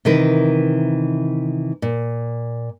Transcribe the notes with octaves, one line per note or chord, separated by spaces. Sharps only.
C3 D#3 E3 A#4 B4
A#2